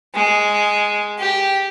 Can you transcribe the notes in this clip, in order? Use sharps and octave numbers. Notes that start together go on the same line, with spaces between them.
G#3
G4